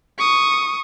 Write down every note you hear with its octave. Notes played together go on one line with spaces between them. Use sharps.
C#6 D#6